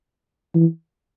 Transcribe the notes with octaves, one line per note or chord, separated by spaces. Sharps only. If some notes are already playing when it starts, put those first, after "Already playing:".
E3